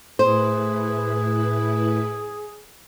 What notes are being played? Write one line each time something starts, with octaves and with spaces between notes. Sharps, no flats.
A2 E4 G#4 B4 C5